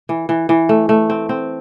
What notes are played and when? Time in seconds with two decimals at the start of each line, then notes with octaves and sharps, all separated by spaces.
0.09 E3
0.29 E3
0.49 E3
0.69 A3
0.89 A3
1.10 C4
1.29 C4